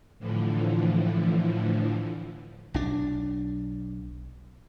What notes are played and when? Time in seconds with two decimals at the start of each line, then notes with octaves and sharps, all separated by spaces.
0.19 A2 D3 E3 F3
2.74 B1 D4